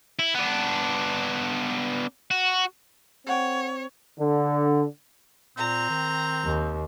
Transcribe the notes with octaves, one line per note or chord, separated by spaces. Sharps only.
E4
B3 D4
F#4
C4 A4 C#5 F#5 G5
D3
A#2 C4 A#5
D#3
D#2